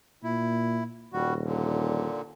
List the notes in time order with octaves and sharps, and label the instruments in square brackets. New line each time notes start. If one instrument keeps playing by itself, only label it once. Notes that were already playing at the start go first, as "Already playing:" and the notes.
[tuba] A#2 [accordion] E4
[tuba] D#1 [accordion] G3 F#4
[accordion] A#2 D3